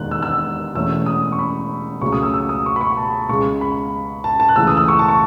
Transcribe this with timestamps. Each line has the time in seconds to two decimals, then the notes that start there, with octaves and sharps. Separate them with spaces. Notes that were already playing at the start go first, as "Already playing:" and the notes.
Already playing: E1 D#2 D#3 G#3 B3 F#6
0.11 E6
0.23 E6
0.75 E1 E2 B2 A3 C#4 E6
1.06 D#6
1.32 C#6
1.39 B5
2.02 C#2 C#3 F#3 A3 C#4 C#6
2.12 D#6
2.23 E6
2.34 E6
2.49 D#6
2.66 C#6
2.76 B5
2.81 C#6
2.97 A5
3.28 C#2 C#3 G#3 C#6
3.61 B5
4.24 A5
4.40 A5
4.49 F#6
4.56 C#2 C#3 E3 A3 E6
4.67 D#6
4.77 E6
4.88 C#6
4.99 A5
5.08 C#6